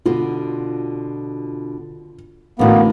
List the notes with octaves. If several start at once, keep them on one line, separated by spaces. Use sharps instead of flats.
B2 D3 F4
A1 A2 D3 A#3 B3 F#4